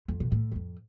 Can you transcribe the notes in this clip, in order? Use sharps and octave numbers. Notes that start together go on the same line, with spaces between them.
F2
B2
A2
E2
F2